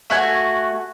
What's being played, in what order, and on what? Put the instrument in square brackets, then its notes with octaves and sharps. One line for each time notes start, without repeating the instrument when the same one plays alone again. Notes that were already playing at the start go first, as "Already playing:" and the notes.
[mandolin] A3 F#4 G#5